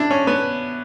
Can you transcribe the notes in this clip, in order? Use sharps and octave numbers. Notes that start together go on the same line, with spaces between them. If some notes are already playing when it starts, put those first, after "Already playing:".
Already playing: D4 E4
C#4
B3